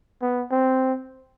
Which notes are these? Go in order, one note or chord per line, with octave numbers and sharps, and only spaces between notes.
B3
C4